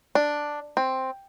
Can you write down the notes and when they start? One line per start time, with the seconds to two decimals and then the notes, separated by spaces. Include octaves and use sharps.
0.15 D4
0.77 C4